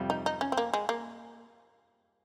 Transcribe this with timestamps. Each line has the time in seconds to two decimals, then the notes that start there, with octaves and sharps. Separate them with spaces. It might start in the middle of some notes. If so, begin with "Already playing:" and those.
Already playing: F2 C3 G3
0.10 D#4
0.26 D#4
0.41 C#4
0.52 C4
0.57 A#3
0.74 G#3
0.89 A#3